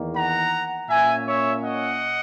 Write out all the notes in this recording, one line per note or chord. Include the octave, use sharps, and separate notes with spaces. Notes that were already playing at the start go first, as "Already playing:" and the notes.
Already playing: E2 D#3 A#3
F#5 A#5
A#2 A#3 C#4 E5 G#5
C#5 E5
D#5 F#5